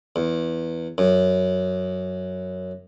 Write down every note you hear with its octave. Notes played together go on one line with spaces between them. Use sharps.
E2
F#2